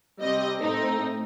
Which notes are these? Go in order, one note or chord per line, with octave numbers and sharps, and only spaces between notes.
C3 G3 C4 D#5
A2 A3 C4 D#4